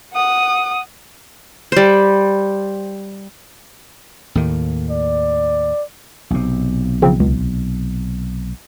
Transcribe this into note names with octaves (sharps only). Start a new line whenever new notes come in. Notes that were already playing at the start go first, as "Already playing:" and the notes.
F#5 D#6
G3 C5
D#2 A2 D#3
D5
B1 C3
C#3 F3 C4
C#2